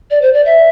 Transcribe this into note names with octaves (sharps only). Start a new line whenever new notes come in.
D5
C5
D5
E5